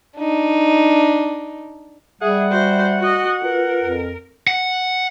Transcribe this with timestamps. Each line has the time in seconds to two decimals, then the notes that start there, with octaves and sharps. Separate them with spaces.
0.17 D4 D#4
2.22 G3 G#4 E5 F#5
2.51 F#4 C5
2.99 F#4 D#5
3.42 F4 A#4 B4
3.82 F2
4.48 F#5